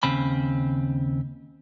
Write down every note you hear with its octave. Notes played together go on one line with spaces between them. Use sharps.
D#2 C#3 C4 B5